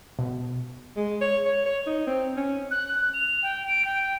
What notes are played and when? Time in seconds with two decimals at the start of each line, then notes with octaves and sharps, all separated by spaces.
0.19 B2
0.96 G#3
1.21 C#5
1.45 C#5
1.66 C#5
1.87 D#4
2.07 C4
2.37 C#4
2.71 F#6
3.14 F7
3.43 G5
3.68 D7
3.85 G5